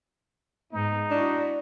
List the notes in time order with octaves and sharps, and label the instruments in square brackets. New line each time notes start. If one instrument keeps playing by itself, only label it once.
[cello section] G#2 G#3 B3 [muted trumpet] D#4
[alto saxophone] D4 [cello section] E4 F#4 [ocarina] D5